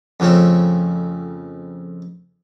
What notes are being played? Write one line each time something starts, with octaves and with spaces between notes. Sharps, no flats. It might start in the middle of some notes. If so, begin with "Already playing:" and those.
F2 C#3 A3 C4